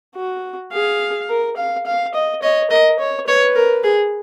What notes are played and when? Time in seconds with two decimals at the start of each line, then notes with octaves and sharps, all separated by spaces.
0.16 F#4
0.72 G#4 F5
1.29 A#4
1.57 F5
1.86 F5
2.14 D#5
2.43 C#5 D#5
2.71 A#4 D#5
2.99 C#5
3.27 B4 C#5
3.55 A#4
3.84 G#4